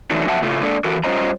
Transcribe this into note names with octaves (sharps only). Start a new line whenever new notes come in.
E3 F#3 A3 D4 D#4
F2 F#3 E5 F#5 A5
A2 C#3 A3 F4
G#3 A#3 D4 A4 D5
E3 F#4 A4 A#4
G3 C#4 F4 C5 D#5 A#5